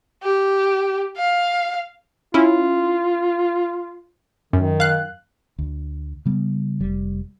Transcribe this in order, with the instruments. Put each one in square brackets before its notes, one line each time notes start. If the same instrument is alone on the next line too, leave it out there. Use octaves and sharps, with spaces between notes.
[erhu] G4
F5
[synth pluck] C#4 E4 [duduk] F4
[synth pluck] F#2 [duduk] D#3
[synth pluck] F5 F#6
[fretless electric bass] D2
C#3 G3 B3
F1 G3